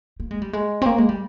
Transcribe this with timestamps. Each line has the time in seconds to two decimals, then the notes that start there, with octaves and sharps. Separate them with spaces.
0.20 A#3
0.31 G#3
0.42 G3
0.53 G#3
0.82 C4
0.86 A#3
0.98 G#3
1.09 G3